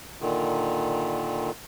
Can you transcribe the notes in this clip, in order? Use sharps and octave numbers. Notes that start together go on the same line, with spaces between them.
A#2 D3 D#3